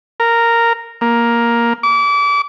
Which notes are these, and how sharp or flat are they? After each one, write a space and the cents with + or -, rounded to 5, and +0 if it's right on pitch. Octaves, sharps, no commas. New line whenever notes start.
A#4 -5
A#3 +10
D6 -30